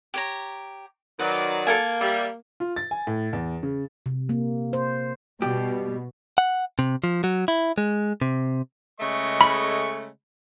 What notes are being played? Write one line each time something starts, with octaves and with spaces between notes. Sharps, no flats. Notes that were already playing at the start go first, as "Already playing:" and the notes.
G4 C#5 A#5
D#3 F#3 B4 D5
A#3 A4 A#4 G#5
G3 E5
F4
A6
G#5
A2
E2
C#3
C3
A#3
C5
B2 G3 G4
F#5
C3
F3
F#3
E4
G#3
C3
C#3 G#3 A3 D#5 C#6
B5